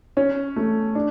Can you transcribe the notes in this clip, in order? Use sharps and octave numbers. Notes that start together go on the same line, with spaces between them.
C#4
A3
D4